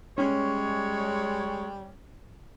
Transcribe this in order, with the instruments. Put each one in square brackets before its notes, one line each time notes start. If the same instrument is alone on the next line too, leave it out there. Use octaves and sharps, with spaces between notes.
[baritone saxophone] G3 [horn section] G#3 C#5 [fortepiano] C#4